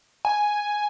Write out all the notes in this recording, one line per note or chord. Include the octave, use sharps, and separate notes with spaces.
G#5